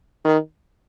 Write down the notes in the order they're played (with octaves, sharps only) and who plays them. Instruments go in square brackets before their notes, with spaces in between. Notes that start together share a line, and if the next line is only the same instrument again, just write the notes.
[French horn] D#3